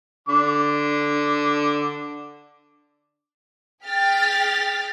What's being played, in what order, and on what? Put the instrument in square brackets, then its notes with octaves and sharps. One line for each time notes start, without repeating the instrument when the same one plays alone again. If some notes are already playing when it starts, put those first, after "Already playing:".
[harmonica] D3 D6
[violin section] G#4 G5 F6 A6 B6